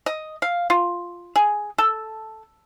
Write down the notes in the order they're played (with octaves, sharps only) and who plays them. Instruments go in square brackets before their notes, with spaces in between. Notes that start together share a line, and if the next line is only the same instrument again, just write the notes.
[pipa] D#5
F5
F4
G#4
A4